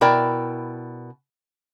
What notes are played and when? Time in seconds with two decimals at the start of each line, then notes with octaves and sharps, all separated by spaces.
0.01 B2 E4 A#4 D5 G5 A5